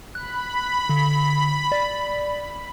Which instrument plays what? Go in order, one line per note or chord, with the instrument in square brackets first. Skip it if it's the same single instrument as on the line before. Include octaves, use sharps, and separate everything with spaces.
[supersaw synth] B5 [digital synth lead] F#6
[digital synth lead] D3
D5